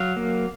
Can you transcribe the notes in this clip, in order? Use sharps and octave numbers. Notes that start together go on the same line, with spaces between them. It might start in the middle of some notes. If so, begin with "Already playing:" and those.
Already playing: F#3 F5
A#3